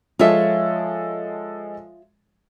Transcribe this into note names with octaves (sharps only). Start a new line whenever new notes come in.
F3 G#3 F4 A4 C#5 E5